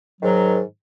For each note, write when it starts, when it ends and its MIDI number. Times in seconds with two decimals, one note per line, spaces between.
0.22 0.61 44
0.22 0.61 51
0.22 0.61 54